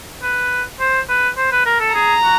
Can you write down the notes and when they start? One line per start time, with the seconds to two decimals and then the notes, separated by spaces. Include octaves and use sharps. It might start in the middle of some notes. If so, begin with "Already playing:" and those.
0.23 B4
0.80 C5
1.09 B4
1.37 C5
1.52 B4
1.66 A#4
1.80 A4
1.94 G#4 A#5
2.23 F#4